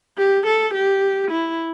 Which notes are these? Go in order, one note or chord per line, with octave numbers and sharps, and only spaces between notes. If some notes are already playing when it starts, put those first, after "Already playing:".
G4
A4
G4
E4